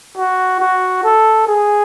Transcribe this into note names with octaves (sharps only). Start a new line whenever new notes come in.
F#4
F#4
A4
G#4